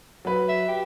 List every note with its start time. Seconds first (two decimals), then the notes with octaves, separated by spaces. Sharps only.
0.25 F#3 B4
0.48 E5
0.68 G4